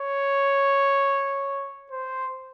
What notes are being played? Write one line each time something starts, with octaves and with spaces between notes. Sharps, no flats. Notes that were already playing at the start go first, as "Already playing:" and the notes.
Already playing: C#5
C5